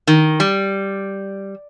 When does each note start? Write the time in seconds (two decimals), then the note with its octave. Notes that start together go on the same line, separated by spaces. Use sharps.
0.07 D#3
0.40 G3